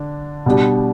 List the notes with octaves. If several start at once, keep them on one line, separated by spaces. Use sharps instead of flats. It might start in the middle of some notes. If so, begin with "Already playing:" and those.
Already playing: D3 D4
B2 G3 D4